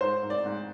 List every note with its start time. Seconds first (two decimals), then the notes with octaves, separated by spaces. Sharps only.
0.01 G#2 C5
0.23 G#2
0.30 D5
0.46 G#2